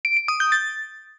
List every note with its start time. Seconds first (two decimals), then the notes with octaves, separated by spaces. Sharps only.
0.05 D7
0.17 D7
0.28 D#6
0.40 G6
0.52 A6